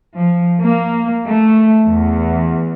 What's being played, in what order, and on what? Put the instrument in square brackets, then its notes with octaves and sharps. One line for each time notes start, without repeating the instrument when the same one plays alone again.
[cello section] F3
A#3
A3
E2